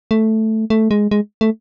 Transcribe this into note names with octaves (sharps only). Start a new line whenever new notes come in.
A3
A3
G#3
G#3
A3